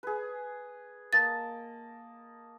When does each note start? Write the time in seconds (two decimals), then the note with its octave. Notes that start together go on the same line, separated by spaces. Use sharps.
0.03 G#4 B4
1.13 A#3 D#5 A5 A6